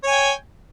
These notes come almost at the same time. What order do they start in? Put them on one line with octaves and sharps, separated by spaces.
C#5 G#5 G5